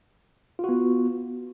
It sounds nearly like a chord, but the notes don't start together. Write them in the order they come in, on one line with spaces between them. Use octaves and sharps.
F4 F#4 B3